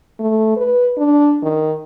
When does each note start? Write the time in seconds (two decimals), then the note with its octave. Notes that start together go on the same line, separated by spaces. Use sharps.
0.20 A3
0.57 B4
0.98 D4
1.42 D#3